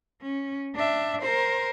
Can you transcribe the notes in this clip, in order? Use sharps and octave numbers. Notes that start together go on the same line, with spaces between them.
C#4
D4 E5
A#4 C5